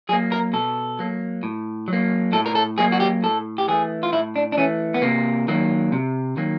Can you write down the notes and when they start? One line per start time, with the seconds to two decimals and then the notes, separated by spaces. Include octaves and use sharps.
0.09 F#3 G#4
0.13 A#3
0.32 A#4
0.53 B2 A4
0.99 F#3 A#3
1.43 A2
1.88 F#3
1.93 A#3
2.32 A2 A4
2.46 A#4
2.55 A4
2.78 F#3 A#3 G#4
2.92 F#4
3.00 G4
3.23 A2 A4
3.58 G4
3.68 E3 A3 G#4
4.03 F4
4.12 A2 E4
4.36 D4
4.52 D4
4.58 E3 A3 C#4
4.94 B3
5.02 C3 A#3
5.48 D#3 F#3 A#3
5.92 C3
6.37 D#3 F#3 A#3